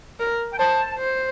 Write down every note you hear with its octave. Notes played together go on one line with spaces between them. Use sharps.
A#4
G5
C5 A5
C5